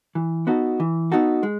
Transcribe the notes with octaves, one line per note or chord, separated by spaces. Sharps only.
E3
B3 D#4 F#4 A4
E3
B3 D#4 F#4 A4
G#3